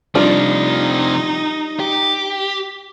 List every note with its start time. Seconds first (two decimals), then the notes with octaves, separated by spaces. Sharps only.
0.15 C3 F3 G3 D4 D#4 F4
1.80 G4